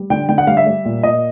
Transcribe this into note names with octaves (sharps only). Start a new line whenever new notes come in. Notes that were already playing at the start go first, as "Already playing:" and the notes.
Already playing: G3
D3 G5
D3 G5
F#5
G3 F5
E5
G3
A#2
A#2 D#5